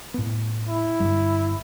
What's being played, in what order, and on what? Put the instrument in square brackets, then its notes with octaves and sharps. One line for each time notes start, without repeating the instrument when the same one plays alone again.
[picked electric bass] A2 B3
[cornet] E4
[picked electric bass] G1 G3